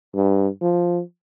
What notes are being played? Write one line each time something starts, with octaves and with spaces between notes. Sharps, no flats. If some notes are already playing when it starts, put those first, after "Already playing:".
G2
F3